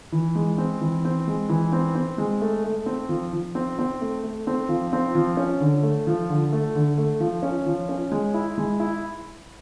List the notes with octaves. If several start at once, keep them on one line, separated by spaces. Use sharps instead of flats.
E3
G#3
C4
E3
C4
G#3
E3
C4
C4
G#3
A3
A3
C4
F3
F3
C4
C4
A3
A3
C4
F3
C4
F3
C#4
D3
A3
F3
D3
A3
D3
A3
F3
C#4
F3
C#4
G#3
E4
G#3
E4